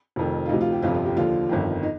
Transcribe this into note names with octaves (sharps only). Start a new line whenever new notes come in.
F1 F2 D#3
F4
D2 C3 F3 D#4
F4
G4
G1 F2 C3 F3 F4
F4
G4
D#2 D3 F3 F4
G1 F2 D#3
D#4